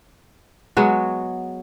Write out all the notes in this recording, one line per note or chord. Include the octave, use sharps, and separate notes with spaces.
F#3 G#3 B3 F#4